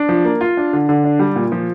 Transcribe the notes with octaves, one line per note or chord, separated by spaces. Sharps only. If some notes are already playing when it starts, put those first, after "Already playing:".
Already playing: D4
F3
A#3
F4
D4
D3
D3
D4
G3
A#2
F3